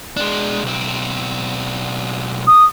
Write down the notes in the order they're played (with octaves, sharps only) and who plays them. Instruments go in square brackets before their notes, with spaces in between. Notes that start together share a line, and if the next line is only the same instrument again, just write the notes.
[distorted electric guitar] G#3 D4
B1 C4
[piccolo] D#6